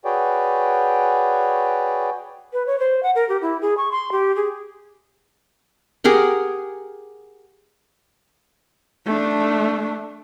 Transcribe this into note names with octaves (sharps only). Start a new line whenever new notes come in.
F#4 G#4 B4 C#5 D5 G5
B4
C#5
C5
F#5
A#4
G4
E4
G#4
C#6
C6
G4
G#4
G4 G#4 A#4 F#5
A3 D4